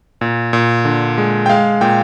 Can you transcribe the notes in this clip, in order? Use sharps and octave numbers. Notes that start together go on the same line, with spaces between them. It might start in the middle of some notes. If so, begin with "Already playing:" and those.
A#2
A#2
D3
G#3
G5
G#3 F5
A#2 G5